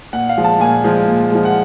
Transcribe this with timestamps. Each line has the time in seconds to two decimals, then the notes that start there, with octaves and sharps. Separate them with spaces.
0.13 A#2 F#5
0.29 F5
0.37 F3 G#3
0.44 A5
0.60 A#2 G#5
0.84 F3 G#3
1.08 A#2
1.31 F3 G#3
1.45 F#5